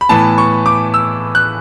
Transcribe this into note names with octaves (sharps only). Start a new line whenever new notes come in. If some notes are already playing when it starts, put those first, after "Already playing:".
B5
A2 E3 B3 A5
C#6
D6
E6
F#6